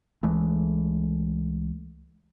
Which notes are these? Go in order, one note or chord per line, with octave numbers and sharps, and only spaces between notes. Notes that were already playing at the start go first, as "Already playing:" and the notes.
C#2 E3 G#3 A3